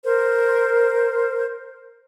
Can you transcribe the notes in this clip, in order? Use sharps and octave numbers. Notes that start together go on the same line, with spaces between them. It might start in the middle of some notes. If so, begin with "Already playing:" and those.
A#4 C5